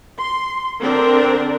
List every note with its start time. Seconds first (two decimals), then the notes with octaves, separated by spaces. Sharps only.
0.20 C6
0.80 D3 C4 D4 A#4